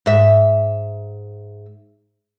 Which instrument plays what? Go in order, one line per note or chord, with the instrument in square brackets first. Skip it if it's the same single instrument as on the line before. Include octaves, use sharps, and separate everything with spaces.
[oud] G#2 E5